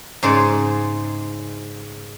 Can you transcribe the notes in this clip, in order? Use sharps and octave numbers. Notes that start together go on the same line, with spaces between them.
G#2 C#3 G#4 C5 D5